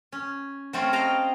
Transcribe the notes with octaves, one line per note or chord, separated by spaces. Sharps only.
C#4
F#3 A3 C4 C#4 F4
D#5 F5 G5 A#5